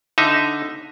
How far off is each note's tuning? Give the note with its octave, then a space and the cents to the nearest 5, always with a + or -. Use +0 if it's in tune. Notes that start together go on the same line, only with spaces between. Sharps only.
D3 +0 D#4 +0 E5 +0